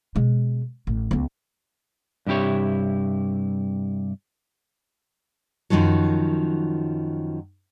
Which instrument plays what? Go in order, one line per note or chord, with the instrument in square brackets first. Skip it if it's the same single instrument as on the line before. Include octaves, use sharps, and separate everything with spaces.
[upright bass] B2 G#3
A1
C#2 B3
[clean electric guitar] G2 C3 E4 G4 C#5
[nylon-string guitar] F#2 B2 D#3 F3 F#3